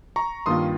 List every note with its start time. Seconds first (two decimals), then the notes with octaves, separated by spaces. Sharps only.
0.16 A#5 C#6
0.46 G2 D#3 A#3 F4 C6 D#6